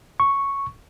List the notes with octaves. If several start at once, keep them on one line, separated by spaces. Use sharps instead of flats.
C#6